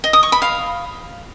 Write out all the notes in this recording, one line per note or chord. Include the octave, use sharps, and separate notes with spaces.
D#5
D#6
C#6
B5
F5